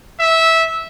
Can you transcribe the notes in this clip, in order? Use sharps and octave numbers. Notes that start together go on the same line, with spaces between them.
E5